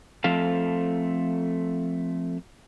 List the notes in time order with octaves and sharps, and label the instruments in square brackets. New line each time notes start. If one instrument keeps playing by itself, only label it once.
[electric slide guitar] F3 A3 C4 A4 F5